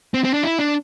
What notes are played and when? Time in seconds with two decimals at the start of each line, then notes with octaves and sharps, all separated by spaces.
0.14 C4
0.24 C4
0.34 D4
0.43 E4
0.59 D4